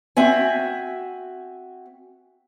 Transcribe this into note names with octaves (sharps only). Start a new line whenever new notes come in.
C4 F#4 E5 G#5